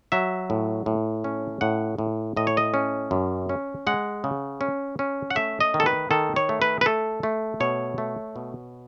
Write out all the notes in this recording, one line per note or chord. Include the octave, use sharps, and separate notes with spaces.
F#3 E5
A2
A2
C#4
A2 F#5
A2
A2 D#5
C#5
D#5
C#4
F#2
C#4
G#3 F#5
C#3
C#4
C#4
F#5
A3 E5
D#5
D#3
A4
B4
D#3 A4
C#5
A3
B4
B4
A3 A4
A3
B2 C#5
A3
B2